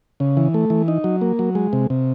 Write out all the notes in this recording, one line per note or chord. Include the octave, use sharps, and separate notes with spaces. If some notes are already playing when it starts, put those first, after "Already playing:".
C#3
E3
A3
E3
D#4
F#3
A#3
F#3
G#3
C3
C3